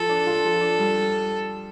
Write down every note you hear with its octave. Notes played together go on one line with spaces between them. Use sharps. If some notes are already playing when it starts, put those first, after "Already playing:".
Already playing: F3 A4
D4
F4
F3
D4
G3